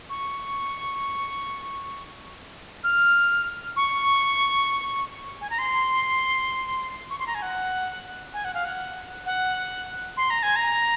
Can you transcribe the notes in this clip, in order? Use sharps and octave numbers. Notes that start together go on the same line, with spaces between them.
C#6
F6
C#6
G#5
A#5
C6
C#6
C6
A#5
G#5
F#5
G#5
F#5
F5
F#5
F#5
C6
A#5
G#5
A#5